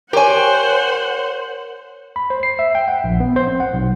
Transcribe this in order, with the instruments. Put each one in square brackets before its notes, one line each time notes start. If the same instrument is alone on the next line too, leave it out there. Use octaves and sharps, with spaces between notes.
[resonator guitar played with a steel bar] G4 G#5 [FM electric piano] A#4 C#5 [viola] C5 F#5
[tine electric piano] B5
C5
C7
E5
G5
F#5
A#1
B3
C5
C4
F#5
B1